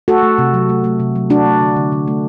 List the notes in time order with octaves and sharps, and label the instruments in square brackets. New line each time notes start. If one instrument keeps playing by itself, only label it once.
[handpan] A3 F#4 A4
A3
C3
F#3
A3
A3
C3
F#3
A3 D4 F#4
A3
D3
D3
D3
A3